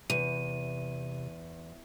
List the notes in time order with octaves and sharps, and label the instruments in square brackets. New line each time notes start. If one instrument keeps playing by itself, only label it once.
[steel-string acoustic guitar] E2 [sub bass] C3 [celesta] D#7